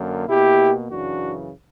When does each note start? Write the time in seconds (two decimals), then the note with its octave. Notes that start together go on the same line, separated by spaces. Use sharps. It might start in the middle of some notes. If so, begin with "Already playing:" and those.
Already playing: F#2 D3 A#3
0.29 B2 A#3 E4 G4
0.90 F#2 C#3 E3 D4 F#4